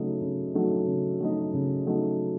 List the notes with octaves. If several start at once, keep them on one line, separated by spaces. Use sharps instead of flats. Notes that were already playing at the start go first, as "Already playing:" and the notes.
Already playing: C#3 F#3 A3 D#4
C#3
F#3 A3 D#4
C#3
F#3 A3 D#4
C#3
F#3 A3 D#4